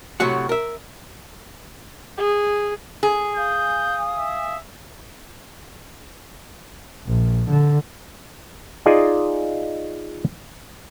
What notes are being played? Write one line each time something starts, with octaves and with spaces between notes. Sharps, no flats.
A2 C3 F#3 F#4 F#5
A#4 E5
G#4
G#4
F5 G#5 D#6 G6
E5
A#1
D3
D#4 F4 G#4 D5 D#5 G#5